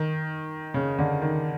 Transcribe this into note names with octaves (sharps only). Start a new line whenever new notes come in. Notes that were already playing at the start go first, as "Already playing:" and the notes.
Already playing: D#3
C#3
D3
D#3